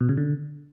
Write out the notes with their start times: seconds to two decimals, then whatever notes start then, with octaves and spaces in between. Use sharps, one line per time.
0.01 B2
0.09 C#3
0.17 D3